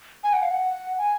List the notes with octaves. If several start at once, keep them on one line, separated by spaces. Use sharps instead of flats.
G#5
F#5
F5
F#5
G#5